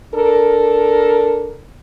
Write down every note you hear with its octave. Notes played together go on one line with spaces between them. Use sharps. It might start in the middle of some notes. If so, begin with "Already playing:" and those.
D4 A4 A#4